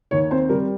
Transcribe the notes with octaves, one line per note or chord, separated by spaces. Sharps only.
D#2 C#5
C4 C5
G3 A#4